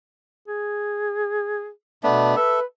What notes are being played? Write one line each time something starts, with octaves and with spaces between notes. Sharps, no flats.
G#4
B2 A3 B3 D4
A4 B4 E5